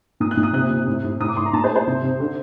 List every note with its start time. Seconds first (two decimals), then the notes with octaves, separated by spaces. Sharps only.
0.20 A#2 D#6
0.31 F#6
0.37 A#2
0.43 D#6
0.53 C3 F#6
0.71 C3
0.87 A2
1.04 A2
1.20 A2 D#6
1.28 D6
1.36 A2 C6
1.46 A#5
1.53 A#2 A5
1.64 C5
1.70 A3
1.76 C5
1.87 C3
2.03 C3
2.20 D3